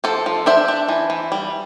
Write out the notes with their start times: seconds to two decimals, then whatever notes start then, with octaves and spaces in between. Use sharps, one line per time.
0.04 F3 A4 C5
0.26 F3
0.46 D4 C5 E5
0.68 D4
0.88 E3
1.10 E3
1.32 G3